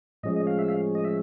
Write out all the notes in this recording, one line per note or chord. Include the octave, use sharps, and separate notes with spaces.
A2 F3 G#3 C#4 D#5
D#5
F5
E5
F5
D#5
E5